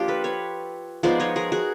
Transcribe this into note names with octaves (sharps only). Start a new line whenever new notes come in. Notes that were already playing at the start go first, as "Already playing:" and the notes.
Already playing: F3 A#3 D4 F4 G4
A4 B4
B4 C#5
F3 G#3 B3 D#4 C5 D5
C#5 D#5
G#4 A#4
F#4 G#4